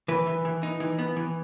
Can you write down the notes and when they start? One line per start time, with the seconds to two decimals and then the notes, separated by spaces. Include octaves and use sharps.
0.08 E3 B4
0.27 E3
0.45 E3
0.63 D#4
0.80 E3
0.99 B3
1.16 E3